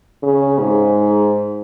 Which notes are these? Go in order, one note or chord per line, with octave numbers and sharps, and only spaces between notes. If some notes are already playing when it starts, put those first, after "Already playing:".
C#3
G#2